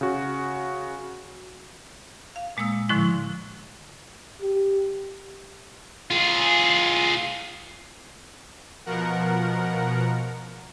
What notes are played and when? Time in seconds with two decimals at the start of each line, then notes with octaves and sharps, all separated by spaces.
0.01 C#3 F#4
2.36 F5
2.57 A#2 G#3 A#3 D#6 E6
2.89 A2 D3 F3 G#3 E4 C6
4.41 G4
6.11 F4 G#4
8.86 B2 F3 A#4 F#5